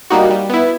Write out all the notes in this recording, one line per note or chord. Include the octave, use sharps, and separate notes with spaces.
G3 A#3 D#4 F#4
G3
B3 E4